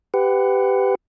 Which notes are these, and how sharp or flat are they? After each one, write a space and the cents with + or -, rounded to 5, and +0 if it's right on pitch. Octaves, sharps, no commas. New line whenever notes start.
G4 +0 B4 +25 F#5 +0